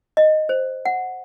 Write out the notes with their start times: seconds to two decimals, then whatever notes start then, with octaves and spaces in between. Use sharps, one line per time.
0.17 D#5
0.49 C5
0.85 F#5